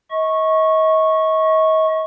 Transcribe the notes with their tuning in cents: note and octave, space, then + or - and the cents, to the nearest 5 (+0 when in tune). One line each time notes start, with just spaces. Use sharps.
D#5 +35 C#6 -10